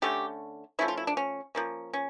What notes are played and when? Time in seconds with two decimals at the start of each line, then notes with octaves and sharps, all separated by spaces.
0.02 D3 A3 C#4 G4
0.79 F3 A3 C#4 E4
0.88 F4
0.97 E4
1.07 D4
1.17 C#4
1.55 F3 A#3 C#4
1.93 C#4